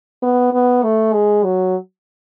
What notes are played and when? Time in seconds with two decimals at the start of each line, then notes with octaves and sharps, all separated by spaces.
0.22 B3
0.53 B3
0.83 A3
1.13 G#3
1.44 F#3